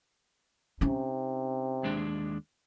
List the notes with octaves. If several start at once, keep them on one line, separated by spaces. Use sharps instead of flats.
C3 C#4 D#4
D#2 G#3 D4